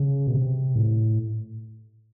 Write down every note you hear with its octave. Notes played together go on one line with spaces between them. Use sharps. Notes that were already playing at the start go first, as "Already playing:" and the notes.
Already playing: C#3
B2
C3
A2